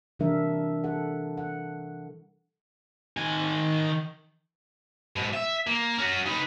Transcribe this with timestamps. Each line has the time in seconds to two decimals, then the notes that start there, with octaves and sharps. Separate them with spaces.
0.19 C3 E3 G3 D4 A#4 E5
0.84 A4 F#5
1.37 F#5
3.17 D#3 G#5
5.16 G#2 B2
5.34 E5
5.67 A#3
5.98 C#4 F#4
6.26 D#4 B4